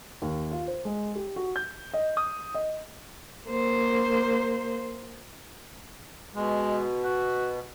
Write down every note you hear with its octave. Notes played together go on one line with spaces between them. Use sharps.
D#2
F4
C5
G#3
G4
F#4
G6
D#5
D#6
D#5
A#3 C5
B2 G#3
F#4